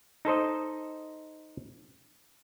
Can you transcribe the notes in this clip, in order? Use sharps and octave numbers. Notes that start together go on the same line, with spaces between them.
D#4 A4 C5 D#5